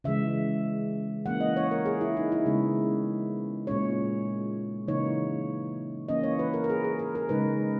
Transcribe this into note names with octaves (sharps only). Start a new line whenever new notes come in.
C#3 E3 G#3 E5
E3 A#3 C#4 F#5
D#5
C#5
A#4
G#4
E4
D#4
E4
C#3 G#3 B3
A#2 G#3 C#4 C#5
C#3 E3 A#3 D#4 C#5
E3 A#3 C#4 D#5
C#5
B4
A#4
A#4
G#4
G#4
A#4
A#4
C#3 G#3 D#4 B4